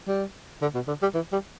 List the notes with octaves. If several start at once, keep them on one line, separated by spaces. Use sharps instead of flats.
G3
D3
B2
D3
G3
E3
G3